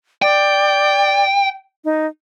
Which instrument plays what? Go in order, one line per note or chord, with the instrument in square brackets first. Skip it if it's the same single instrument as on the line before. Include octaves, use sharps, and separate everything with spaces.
[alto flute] D5 [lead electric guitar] G5
[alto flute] D#4